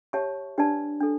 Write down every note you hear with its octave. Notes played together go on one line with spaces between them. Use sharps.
G4 C#5 E5 A5 C#6
D4 G4 B4 D5 A5
D4 A4